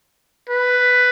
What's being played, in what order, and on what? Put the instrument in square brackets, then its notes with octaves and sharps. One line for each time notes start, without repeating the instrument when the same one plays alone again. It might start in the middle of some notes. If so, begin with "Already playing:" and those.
[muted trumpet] B4